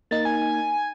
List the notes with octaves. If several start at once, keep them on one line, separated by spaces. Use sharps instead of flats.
A#3 D#4 A6
G#5